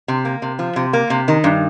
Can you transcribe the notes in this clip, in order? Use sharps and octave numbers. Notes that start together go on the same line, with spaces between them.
C3
A#3
C3
F3
C3
A#3
C3
D#3
G2